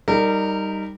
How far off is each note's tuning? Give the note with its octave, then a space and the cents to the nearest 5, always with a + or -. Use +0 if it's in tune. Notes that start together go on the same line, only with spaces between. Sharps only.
G3 +0 D#4 +0 A#4 -25